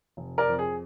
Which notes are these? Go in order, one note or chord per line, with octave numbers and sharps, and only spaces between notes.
F1
A#4 D5
F2
G#4